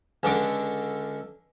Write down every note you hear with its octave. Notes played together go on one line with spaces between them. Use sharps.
C#2 D3 D6